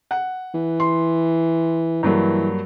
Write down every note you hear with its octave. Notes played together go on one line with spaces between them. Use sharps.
F#5
E3
C6
G2 E3 F#3 A#3